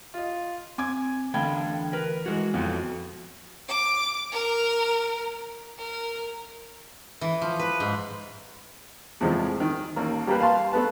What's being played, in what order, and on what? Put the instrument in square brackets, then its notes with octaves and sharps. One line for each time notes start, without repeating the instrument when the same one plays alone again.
[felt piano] F4 D#5
[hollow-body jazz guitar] C4 [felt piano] G#5 D6 G#6
[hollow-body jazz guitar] E2 A3 B5 [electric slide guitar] D3 G5 [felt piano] F5 A5 G#6
[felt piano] A#4 [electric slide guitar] B4
[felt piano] E3 G#3 [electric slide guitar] F#4
[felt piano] F2 [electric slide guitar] B3 F#4 A4
[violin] D6
A#4
A#4
[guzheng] E3
F3
B4
G#2
[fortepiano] E2 A2 C3 F3 G#3
D#3
A1 A#3
G3 A#3 G4 B4
F5 A5 C6
A3 B3 B4 A5